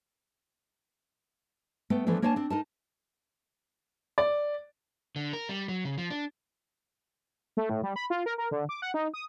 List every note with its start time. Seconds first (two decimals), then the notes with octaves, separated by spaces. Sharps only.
1.90 A3 B3 G5
2.07 E3 F3 A3 B3 D4
2.22 A#3 D4 C#5 F5 G#5 A5
2.36 C4 D4
2.50 D#4 A#4 A5
4.18 D5
5.16 D3
5.33 A#4
5.49 G3
5.68 F#3
5.85 C#3
5.98 F3
6.10 D4
7.57 A3
7.70 A2
7.83 G3
7.96 B5
8.10 F4
8.26 A#4
8.38 A#4
8.51 D3
8.69 D6
8.82 F#5
8.94 D#4
9.14 D#6